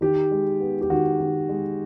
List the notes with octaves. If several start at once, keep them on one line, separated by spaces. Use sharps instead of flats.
D#3 G4
G#3
B3
G4
D#3 F#4
D#3
G#3